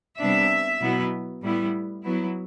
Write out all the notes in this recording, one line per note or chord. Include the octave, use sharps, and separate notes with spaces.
C3 G3 B3 D4 E5
B2 F#3 B3 E4
A2 G3 B3 E4
F#3 B3 E4